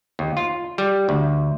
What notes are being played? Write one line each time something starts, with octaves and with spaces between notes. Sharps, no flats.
D#2
F4
G3
D2